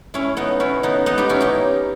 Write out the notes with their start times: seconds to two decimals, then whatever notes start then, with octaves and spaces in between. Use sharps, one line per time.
0.14 C#4 E4
0.37 B3 D#4
0.60 C#4 E4
0.83 B3 D#4
1.06 B3 D#4
1.18 D#4 G4
1.29 C#4 E4
1.41 D#4 G4